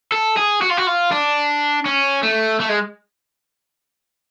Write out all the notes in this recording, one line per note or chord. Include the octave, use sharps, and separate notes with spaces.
A4
G#4
F#4
F4
F#4
F4
D4
C#4
A3
A3
G#3